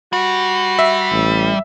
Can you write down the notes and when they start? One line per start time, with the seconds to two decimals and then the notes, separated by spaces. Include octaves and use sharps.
0.13 G3 F#4
0.79 E5
1.12 A1